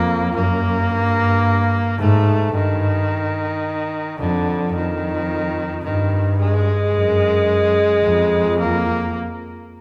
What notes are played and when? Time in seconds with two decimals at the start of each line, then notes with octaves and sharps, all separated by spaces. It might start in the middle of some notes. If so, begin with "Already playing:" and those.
Already playing: F2 A#3
0.35 F#2 A#3
0.90 G2
1.99 G#2 A3
2.55 G2 D#3
4.19 F2 D3
4.75 F2 D#3
5.84 G2 D#3
6.39 G#3
6.94 F#2
8.04 F2
8.59 A#3